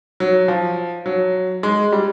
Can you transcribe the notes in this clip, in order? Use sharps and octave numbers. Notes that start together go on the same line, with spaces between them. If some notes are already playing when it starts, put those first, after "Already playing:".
F#3
F3
F#3
G#3
G3